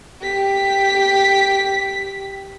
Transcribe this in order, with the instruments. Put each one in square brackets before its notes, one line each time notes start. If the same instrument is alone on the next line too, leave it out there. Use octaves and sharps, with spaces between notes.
[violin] G4 B6